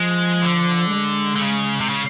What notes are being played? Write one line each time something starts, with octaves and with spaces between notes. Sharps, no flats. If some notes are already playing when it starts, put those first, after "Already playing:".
Already playing: F3 G#3
D3
G#3
D3
C#3
C3
C#3